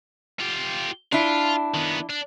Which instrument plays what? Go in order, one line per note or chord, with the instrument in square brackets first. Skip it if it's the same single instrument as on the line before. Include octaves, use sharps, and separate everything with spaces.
[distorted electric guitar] F4 G4
[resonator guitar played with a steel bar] D4 E4 [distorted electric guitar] F4
[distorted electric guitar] D#3 B3
D4